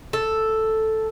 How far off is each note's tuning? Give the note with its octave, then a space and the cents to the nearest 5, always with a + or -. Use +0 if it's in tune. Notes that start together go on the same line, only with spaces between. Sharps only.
A4 +0